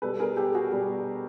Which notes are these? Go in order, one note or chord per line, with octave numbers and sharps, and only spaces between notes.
B2 G3 A4 B4
G#4 A#4
G4 A4
F#4 G#4
B2 G3